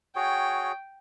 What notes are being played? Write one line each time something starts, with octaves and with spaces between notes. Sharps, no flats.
F#4 G#4 C#5 G5